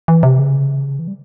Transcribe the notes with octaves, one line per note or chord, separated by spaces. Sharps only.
E3
C3
C#3
E3
G3